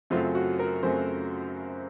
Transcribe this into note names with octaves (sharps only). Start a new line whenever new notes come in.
F#2 C#3 F#3 A3 C4 F4
F#4
A#4
F#2 C#3 F#3 A3 C4 C5